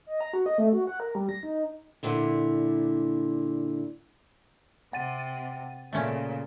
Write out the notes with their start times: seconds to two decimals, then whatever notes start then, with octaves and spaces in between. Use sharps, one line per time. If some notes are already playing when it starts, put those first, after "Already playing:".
0.07 D#5
0.21 A#5
0.33 F#4
0.46 D#5
0.58 A3
0.73 F#4
0.87 F#5
1.00 A#4
1.15 G3
1.29 A#6
1.43 D#4
2.03 A#2 D3 E4
4.93 C3 F#5 A6 D#7
5.93 A#2 C#3 A3 C#4